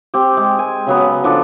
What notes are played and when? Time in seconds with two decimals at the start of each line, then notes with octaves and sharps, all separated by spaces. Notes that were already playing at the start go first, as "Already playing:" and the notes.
0.14 C4 G4
0.37 G#3
0.59 G#5
0.87 C#3 F#3 B3
1.24 F3 D4 A4